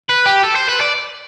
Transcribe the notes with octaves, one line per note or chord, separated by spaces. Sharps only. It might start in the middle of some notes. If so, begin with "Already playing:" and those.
B4
G4
A4
C5
B4
D5